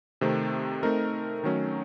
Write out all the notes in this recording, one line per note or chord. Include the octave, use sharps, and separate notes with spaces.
C3 D#3 A3 C4
A3 C4 D#4 A#4
D#3 F#3 A3 C#4